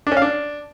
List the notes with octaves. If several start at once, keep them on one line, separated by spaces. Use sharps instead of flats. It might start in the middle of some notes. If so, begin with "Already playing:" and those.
D4
C#4
F5
D4